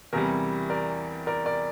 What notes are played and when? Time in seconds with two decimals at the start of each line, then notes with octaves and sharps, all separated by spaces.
0.13 E2 C3 E3 G3 A#4
0.70 A#4 D5
1.27 A#4 D5
1.46 A#4 D5